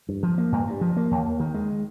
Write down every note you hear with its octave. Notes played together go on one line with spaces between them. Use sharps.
G2
F3
A#3
G2
G2
F3
A#3
D#2
D#2
D#3
G#3